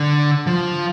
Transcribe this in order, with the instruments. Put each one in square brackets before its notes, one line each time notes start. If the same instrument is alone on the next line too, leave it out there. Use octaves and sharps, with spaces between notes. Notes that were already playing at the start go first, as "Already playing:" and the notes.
Already playing: [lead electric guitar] D3
F3